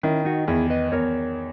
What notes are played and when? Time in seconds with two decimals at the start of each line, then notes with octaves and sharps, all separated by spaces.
0.03 D#3 C#4 E4
0.25 D#4 F#4
0.48 E2 E4 G#4
0.70 B4 D#5
0.92 E2 A#4 C#5